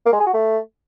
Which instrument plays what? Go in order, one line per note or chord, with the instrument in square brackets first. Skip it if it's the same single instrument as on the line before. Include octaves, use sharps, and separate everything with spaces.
[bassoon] A#3
G#3
G#4
F#4
A3